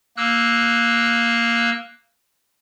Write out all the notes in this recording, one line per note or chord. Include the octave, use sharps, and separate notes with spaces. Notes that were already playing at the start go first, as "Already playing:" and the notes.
A#3 E6 F#6